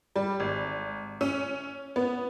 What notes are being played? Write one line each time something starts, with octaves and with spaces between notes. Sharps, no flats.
G3
G#1
C#4
B3